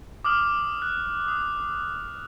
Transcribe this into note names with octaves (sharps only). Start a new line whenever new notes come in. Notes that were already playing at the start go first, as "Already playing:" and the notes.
D6 D#6 F6 F#7
F#6
D#6